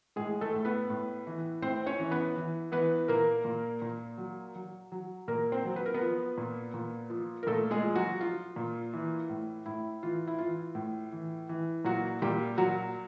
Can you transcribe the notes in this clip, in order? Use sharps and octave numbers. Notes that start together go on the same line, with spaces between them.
A2 G#3 G#4
A3 A4
A2
B3 B4
A2
E3
A2 C4 C5
C#4 C#5
E3
B3 B4
E3
E3 B3 B4
A#2 A#3 A#4
A#2
A#2
F#3
F#3
F#3
A#2 A#3 A#4
C4 C5
F#3
B4
A#4
B3 B4
F3
A#2
A#2
F3
A#4
A#2 A3 A4
G#3 G#4
F3
F#3 F#4
F3 F4
A#2
E3
A2
A2 E4
E3 F4
E4
E3 F4
A2
E3
E3
A#2 F#3 F#4
A#2 G3 G4
A#2 F#3 F#4